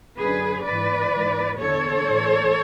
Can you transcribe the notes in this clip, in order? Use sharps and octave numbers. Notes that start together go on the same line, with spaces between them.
F#2 D3 G#4 B4
G#2 E3 B4 D5
G#2 E3
E2 D3 A4 C#5
A2 E3